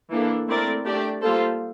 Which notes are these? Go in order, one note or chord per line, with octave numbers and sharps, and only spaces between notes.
E3 A#3 D4 A4
A3 C4 E4 A#4 D5
A3 D4 G4 D5
G3 A#3 F4 A4 C5